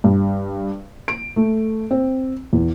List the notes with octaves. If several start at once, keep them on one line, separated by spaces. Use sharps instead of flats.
G2
D7
A3
C4
E2